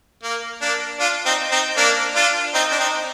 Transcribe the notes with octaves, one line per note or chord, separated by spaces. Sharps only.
A#3
A#3 D4
D4 F4
C4 D#4
C4 D#4
A#3 D4
D4 F4
C4 D#4
D4
C4 D#4